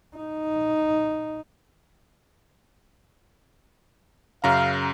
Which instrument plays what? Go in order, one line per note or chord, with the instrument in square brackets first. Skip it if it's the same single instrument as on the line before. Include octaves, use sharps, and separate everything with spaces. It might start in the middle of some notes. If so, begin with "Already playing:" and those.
[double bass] D#4
[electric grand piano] F#2 C#3 A#5 [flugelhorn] F5